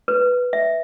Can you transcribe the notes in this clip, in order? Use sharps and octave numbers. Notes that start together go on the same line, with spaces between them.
B4
E5